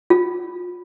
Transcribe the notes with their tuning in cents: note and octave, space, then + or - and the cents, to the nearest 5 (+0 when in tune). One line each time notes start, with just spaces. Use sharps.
F4 +35